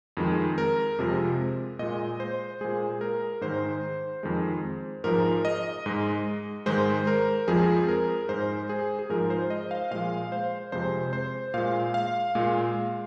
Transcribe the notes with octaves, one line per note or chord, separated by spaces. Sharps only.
F2 D#3 G#3
A#4
F2 C3 F3 G#3
A#2 G#3 D#5
C5
A#2 G#3 G#4
A#4
G#2 D#3 G#3 C5
F2 D#3 G#3
G#2 F3 G#3 A#4
D#5
G#2 G#3
G#2 D#3 G#3 C5
A#4
F2 F3 G#3 G#4
A#4
G#2 G#3 C5
G#4
G#4
G#2 F3 G#3 A#4
C5
D#5
F5
A#2 F3 G#3 F5
C5
F2 C3 G#3 C5
C5
A#2 G#3 F5
F5
A#2 G#3